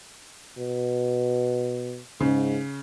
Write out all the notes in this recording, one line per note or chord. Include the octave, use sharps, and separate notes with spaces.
B2
G#2 C#3